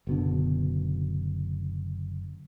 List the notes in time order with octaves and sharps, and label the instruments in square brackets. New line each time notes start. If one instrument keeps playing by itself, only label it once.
[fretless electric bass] F#1 B2 D3